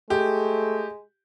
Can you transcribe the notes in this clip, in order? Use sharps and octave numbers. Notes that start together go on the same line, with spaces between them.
G#3 A3 G4